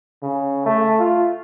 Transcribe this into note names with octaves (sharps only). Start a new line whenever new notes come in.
C#3
A3
F4